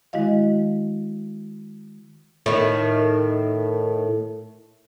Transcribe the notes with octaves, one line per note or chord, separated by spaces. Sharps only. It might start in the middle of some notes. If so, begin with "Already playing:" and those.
D#3 G#3 E4 F#4 D#5 F5
A2 D#3